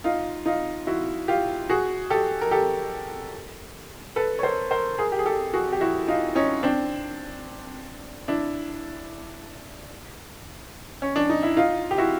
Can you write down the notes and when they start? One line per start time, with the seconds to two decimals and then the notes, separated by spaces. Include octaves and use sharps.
0.04 D#4 F4
0.46 D#4 F4
0.87 E4 F#4
1.28 F4 G4
1.70 F#4 G#4
2.10 G4 A4
2.41 A#4
2.51 G4 A4
4.16 A4 B4
4.39 C#5
4.43 A#4 C5
4.71 A#4 C5
4.99 G#4 A#4
5.12 G4
5.19 G#4
5.25 G4 A4
5.54 F#4 G#4
5.72 G4
5.81 E4 F#4
6.08 D#4 F4
6.35 C#4 D#4
6.63 C4 D4
8.28 D4 E4
11.02 C#4
11.16 D4
11.29 D#4
11.43 E4
11.57 D#4 F4
11.91 G4
11.98 E4 F#4